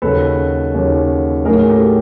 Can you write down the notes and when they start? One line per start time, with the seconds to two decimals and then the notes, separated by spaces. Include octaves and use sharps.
0.02 D#2 C#3 F#3 A4 B4
0.74 D#2 C#3 F#3
1.45 A2 F#3 G#4 A#4
1.69 G4 A4